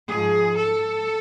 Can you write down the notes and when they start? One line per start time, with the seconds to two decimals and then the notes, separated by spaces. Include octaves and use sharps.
0.10 G#2 F3 G#4
0.56 A4